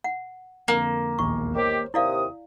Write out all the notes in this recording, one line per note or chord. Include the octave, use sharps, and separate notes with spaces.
F#5
F2 D3 A#3
E1 A#1 D#2 C#6
D#3 G4 C5 C#5
D#2 C3 E4 D5 F5 D#6